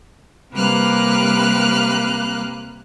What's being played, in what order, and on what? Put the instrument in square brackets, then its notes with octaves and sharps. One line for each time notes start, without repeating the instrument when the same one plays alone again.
[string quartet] C3 G3 A#3 B4 F6 F#6